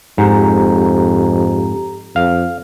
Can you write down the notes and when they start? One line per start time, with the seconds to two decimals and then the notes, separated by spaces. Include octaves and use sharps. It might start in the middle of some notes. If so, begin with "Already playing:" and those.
0.18 F2 G#2 G4 A#5
2.16 F2 F5